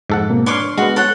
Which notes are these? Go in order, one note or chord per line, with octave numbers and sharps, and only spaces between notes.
F2 G#2 A4 F#5
B2 A#3 C4
D4 C#5 C6 D6 F6
G#3 B3 F#4
A4 C#5 F#5